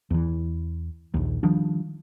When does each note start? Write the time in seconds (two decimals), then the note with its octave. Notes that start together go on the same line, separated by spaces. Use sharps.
0.11 E2 E3
1.14 A#1 D#2
1.43 D#3 F3 G3 D4